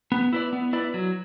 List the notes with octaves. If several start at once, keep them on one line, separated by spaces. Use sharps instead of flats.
B3
E4 B4 D5
B3
E4 B4 D5
F#3